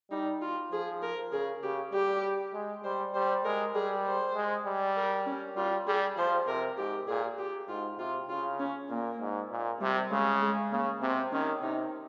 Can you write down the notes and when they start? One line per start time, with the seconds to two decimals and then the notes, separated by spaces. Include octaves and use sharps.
0.11 G3 D#4
0.42 F4
0.72 F3 G#4
1.02 A#4
1.32 C#3 G#4
1.62 C#3 G4
1.93 G3 G4
2.54 G#3
2.84 G3 C5
3.14 G3 C5
3.45 G#3 A#4
3.75 G3 G#4
4.05 C5
4.35 G#3
4.66 G3
4.96 A#4
5.26 C#4
5.57 G3 F4
5.87 G3 G#4
6.17 F3 C5
6.47 C3 A#4
6.77 G#2 G4
7.08 A#2 G#4
7.38 G4
7.69 G#2 F4
7.99 C3 F4
8.29 C#3 F4
8.60 C#4
8.90 A#2 A#3
9.21 G#2
9.51 A#2
9.81 C3 G3
10.11 C#3 G#3
10.41 G#3
10.72 C#3 A#3
11.02 C3 C4
11.32 D#3 C#4
11.62 C3 D#4